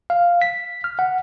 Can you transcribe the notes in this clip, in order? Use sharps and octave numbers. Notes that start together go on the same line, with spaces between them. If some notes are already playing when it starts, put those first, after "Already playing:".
F5
B6
F6
F#5